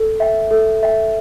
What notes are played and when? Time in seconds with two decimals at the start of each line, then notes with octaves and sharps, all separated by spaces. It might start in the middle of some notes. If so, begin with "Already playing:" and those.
Already playing: A4
0.20 E5 G5
0.51 A4
0.83 E5 G5